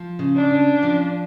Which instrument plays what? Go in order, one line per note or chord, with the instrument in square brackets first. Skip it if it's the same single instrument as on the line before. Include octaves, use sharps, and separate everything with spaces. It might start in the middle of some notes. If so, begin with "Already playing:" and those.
Already playing: [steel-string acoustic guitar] F3
C#3
[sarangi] D4
[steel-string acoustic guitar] C#4
F3